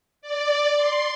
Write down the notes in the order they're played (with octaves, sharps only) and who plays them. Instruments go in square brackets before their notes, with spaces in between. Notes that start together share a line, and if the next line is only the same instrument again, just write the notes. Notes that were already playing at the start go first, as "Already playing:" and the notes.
[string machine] D5
C6